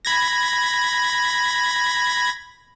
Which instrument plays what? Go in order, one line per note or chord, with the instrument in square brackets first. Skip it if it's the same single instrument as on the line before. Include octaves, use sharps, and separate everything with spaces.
[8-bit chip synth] B5 G#6 A#6